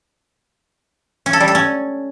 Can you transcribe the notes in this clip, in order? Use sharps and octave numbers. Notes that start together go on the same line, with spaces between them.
C#4
A4
G3
A4
C#4